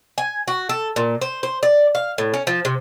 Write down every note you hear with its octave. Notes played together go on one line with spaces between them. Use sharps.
G#5
F#4
A4
A#2
C5
C5
D5
F5
A2
C#4
F3
C3